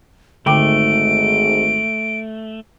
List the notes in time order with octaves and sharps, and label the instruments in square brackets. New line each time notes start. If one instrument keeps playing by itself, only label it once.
[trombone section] G#1 G#2 [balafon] D3 G5 D6 [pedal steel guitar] A3 [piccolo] D7